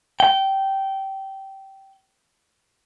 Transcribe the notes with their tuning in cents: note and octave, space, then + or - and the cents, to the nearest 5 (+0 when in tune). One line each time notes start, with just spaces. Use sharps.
G5 -15